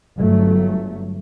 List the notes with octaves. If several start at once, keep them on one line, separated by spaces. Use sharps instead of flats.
G1 F#3 A3